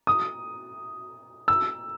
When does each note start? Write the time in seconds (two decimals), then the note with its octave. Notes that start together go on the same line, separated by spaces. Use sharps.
0.07 D#6
1.48 E6